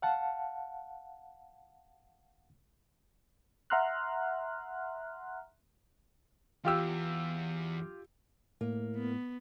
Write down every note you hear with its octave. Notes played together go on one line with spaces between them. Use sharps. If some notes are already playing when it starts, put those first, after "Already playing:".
F5 F#5 A5
E5 F#5 A#5 C6 F6 F#6
E2 F4 G4 E6
A2 A#3
B3